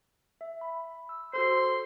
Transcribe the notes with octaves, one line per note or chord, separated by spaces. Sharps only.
E5
B5
E6
F#4 A4 C5 C6